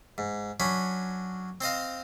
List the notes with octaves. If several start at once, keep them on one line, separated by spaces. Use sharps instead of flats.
G#2
F#3 C#4 D4 B5
C4 C5 D#5 F5